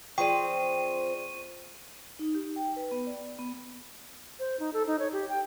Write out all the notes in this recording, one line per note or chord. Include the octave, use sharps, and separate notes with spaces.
F3 C4 F4 G#4 D5 G5 C#6 D#7
D#4
G4
G5
B4
B3
D5
B3
C5
D#4
A4
D#4
C#5
G4
G5